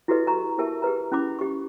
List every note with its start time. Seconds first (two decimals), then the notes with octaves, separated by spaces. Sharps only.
0.08 E4 F#4 G4 A4 B4 D#5
0.27 A#5 C#6
0.58 E4 G4 A#4 E5 A5
0.82 G4 G#4 B4 A#5
1.12 C#4 E4 B5 D6
1.39 G4 C#6